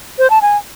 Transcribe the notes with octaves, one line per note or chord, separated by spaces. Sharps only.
C5
A5
G#5